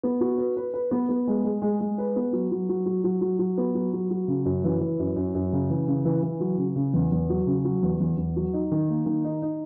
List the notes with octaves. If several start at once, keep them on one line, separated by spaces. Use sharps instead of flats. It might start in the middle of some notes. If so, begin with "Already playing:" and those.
B3
F#4
B4
B4
B4
B3
B3
G#3
G#3
G#3
G#3
B4
B3
F#3
F#3
F#3
F#3
F#3
F#3
F#3
B3
F#3
F#3
F#3
C#3
F#2
E3
E3
F#2
F#2
F#2
C#3
E3
C#3
E3
E3
F#3
C#3
C#3
E2
E2
F#3
C#3
F#3
E2
E2
E2
F#3
D#4
D#3
A#3
D#3
D#4
D#4